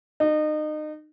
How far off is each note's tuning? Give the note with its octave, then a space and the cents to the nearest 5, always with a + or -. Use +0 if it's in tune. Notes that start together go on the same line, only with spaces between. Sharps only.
D#4 -30